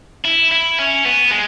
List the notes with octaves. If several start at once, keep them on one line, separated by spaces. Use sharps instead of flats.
E4
E4
C#4
B3
G#3